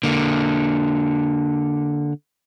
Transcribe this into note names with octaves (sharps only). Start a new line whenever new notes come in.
D3 A#3